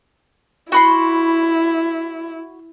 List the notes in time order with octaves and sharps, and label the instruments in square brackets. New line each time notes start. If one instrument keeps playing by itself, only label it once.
[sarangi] E4 [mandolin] F#4 B5 C6